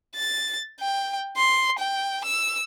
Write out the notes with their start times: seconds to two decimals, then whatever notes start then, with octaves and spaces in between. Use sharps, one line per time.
0.15 A6
0.81 G5
1.37 C6
1.79 G5
2.24 E6